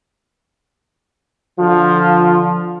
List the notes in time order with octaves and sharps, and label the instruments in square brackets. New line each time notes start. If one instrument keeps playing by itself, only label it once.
[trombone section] D3 F3 F4